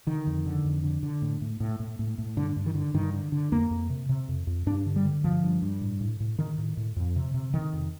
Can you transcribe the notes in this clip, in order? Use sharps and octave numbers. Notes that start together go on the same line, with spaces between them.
D3 D#3
F2
D3
F2
D3
D3
A2
A2
A2
A2
A2
A2
G2 D3
G2
D#3
D3
G2 D#3
D3
D3
F2 A#3
F2
C3
C3
F2
F2
G2 D4
D3
G3
D3
G2 F3
G2
G2
A2
A2
A2
A2 D#3
A2
A2
F2
C3
C3
C3 D#3
F2